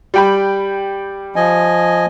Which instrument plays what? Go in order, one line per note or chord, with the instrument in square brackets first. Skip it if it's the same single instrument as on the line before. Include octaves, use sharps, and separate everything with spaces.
[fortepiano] G3 G5 B5
[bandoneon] F3 D#5 G#5